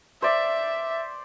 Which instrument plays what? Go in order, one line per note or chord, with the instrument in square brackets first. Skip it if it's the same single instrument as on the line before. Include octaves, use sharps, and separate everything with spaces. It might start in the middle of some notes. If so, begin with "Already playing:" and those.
[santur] C5 D5 [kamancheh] E5